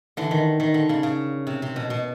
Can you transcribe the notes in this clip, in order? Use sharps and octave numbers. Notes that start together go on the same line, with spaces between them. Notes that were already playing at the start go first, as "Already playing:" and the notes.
D3 E3
D#3
D#3
D3
C#3
C#3
C3
C3
B2
B2